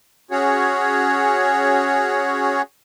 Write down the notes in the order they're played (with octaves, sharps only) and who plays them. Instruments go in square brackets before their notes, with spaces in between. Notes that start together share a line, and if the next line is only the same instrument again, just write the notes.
[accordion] C#4 F#4 G#4 C#5